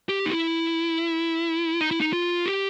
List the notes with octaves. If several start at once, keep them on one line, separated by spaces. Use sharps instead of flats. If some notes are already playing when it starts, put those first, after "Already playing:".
G4
D#4
E4
D#4
E4
D#4
F4
G4